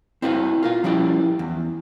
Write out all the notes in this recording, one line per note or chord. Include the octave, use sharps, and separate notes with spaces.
C4 E4 F#4 B4 E5 F5
F4 A#4 F5
F3 G3 C#4 E4 D5
E2